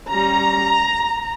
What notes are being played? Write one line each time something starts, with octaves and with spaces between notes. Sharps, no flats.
G3 C#4 A#5